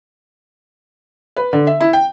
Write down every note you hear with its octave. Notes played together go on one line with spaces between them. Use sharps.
B4
D3
E5
E4
G5